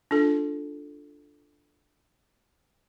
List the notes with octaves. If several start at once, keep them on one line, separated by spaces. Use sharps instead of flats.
D4 F4 A4